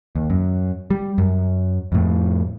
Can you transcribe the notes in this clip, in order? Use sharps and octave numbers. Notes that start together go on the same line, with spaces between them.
D#2
F#2
G3
F#2
F2 A2